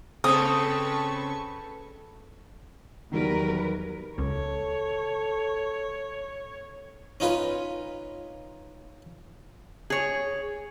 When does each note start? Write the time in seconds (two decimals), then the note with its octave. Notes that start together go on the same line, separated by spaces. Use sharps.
0.24 C#3 C4 A4 B4 C#6 D#6
3.12 E2 D#3 F#3 G3 A#4 B4
4.18 C#2 A4 C#5
7.20 C#4 D#4 F4 B4
9.90 G#4 C#5